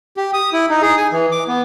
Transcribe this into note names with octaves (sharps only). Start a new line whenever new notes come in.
G4
D#6
E4
D#4
G#4
G#5
E3
D6
B3